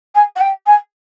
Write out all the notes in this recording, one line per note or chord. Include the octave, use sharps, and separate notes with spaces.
G#5
F#5
G5
G#5